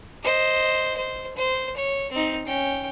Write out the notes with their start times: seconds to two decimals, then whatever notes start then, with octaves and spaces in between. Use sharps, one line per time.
0.23 C5 D#5
0.97 C5
1.37 C5
1.76 C#5
2.12 C4 D#4
2.46 C#4 G5